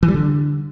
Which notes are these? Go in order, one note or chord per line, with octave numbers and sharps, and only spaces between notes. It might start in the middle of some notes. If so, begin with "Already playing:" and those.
E3
G3
D3